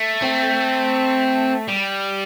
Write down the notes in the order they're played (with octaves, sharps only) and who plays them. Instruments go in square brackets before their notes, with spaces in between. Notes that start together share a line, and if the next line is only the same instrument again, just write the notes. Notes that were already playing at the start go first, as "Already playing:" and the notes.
Already playing: [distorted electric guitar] A3
[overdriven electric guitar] C4
[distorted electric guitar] G3